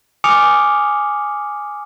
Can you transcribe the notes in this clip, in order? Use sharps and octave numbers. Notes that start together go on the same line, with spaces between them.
G#5 D6 D#6 F6 C#7 F7